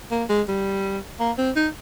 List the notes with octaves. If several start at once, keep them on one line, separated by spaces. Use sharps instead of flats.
A#3
G#3
G3
A#3
C4
D#4